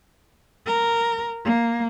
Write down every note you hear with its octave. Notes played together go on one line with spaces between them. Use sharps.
A#4
A#3